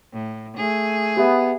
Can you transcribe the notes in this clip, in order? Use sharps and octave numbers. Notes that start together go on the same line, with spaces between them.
A2
A3 G#4
B3 G4 E5